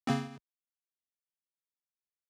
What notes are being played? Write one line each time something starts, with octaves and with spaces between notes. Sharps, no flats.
C#3 A#3 C4